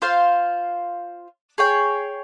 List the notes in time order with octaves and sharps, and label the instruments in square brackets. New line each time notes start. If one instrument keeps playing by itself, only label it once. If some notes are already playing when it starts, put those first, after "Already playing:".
[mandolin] F4 C5 F5
G#4 C#5 G5